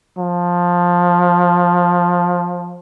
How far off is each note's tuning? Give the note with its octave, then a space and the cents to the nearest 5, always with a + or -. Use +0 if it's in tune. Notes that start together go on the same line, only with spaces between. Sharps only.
F3 +10